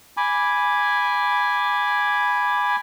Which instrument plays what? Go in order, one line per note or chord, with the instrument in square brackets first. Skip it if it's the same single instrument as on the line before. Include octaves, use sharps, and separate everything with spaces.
[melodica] G#5 B5 D6